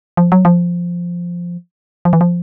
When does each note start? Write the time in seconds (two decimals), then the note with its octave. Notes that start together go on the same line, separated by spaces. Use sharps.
0.17 F3
0.32 F#3
0.45 F3
2.05 F3
2.13 E3
2.21 F3